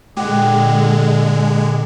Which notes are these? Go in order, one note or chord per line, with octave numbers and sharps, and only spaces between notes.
A#2 D3 G#3 G4 F#5